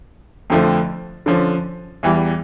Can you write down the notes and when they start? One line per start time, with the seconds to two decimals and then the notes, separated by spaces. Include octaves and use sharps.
0.50 F2 D3 F3 A3
1.26 D3 F3 C#4
2.03 E2 E3 G3